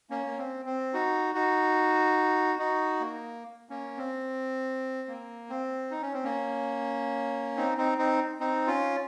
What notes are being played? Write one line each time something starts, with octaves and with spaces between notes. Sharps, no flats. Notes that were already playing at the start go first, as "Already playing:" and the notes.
A#3 C#4
A#3
C4
C4
D#4 F#4
D#4 F#4
D#4 F#4
A#3
A#3 C#4
C4
A#3
C4
D#4
C#4
C4
A#3 C#4
C4 D#4
C4 D#4
C4 D#4
C4 D#4
C#4 F4